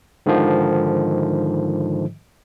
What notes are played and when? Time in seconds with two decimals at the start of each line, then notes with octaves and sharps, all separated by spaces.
0.26 G#2 D3 D#3 F3